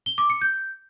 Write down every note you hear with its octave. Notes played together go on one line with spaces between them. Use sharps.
G7
D6
C#7
G6